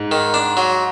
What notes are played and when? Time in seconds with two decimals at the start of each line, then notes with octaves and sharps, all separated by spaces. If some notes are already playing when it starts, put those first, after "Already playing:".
Already playing: G#2
0.12 D#3
0.34 D4
0.57 F#3